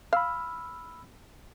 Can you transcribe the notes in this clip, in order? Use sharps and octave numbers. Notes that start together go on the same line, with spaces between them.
F5 B5 E6 F6